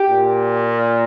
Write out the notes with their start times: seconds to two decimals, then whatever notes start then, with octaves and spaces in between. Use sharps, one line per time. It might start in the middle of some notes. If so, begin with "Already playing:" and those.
Already playing: G4
0.10 A#2